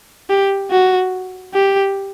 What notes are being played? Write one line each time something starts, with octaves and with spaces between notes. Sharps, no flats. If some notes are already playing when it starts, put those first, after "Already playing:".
G4
F#4
G4